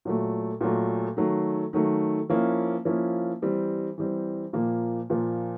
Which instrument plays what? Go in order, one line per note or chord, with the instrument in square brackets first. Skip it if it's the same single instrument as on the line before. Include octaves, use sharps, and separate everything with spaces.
[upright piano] A#2 F#3 A3
A#2 F#3 A3
D#3 F#3 A3
D#3 F#3 A3
F3 A#3 C#4 E4
F3 A#3 C#4 E4
E3 G3 C4
E3 G3 C4
A#2 F3 A#3
A#2 F3 A#3